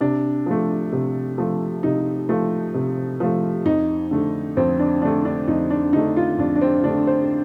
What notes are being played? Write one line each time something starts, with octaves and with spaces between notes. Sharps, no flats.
C3 D4
F3 A3
C3
F3 A3
C3 D#4
F3 A3
C3
F3 A3
F2 D#4
D3 A3
F2 C4
D4
D3 A3 D4
D4
F2 D#4
D4
D3 A3 D#4
F4
F2 D4
D4
C4
D3 A3 D4
C5